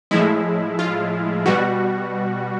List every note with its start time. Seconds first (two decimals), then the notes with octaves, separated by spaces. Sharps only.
0.11 A2 F3 G#3 E4
0.79 F4
1.46 B2 G3 F#4